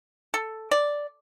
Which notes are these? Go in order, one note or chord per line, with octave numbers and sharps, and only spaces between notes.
A4
D5